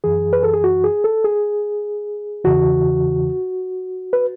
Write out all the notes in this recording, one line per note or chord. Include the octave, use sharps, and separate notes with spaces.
F#2 E3 G#4
B4
A4
G#4
F#4
G#4
A4
G#4
E2 C#3 E3 F#4
B4